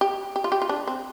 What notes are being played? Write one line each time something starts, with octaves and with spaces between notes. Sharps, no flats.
G4
G4
F4
G4
F4
D4
C4